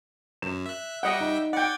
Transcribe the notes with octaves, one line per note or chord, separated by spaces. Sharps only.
F#2 E7
E5 F#6
G3 D#5 E5 F#5 G5
D#4
D5 F#5 G5 G#6